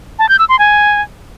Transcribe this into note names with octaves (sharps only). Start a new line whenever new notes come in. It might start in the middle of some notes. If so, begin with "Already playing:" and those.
A5
G6
E6
C6
G#5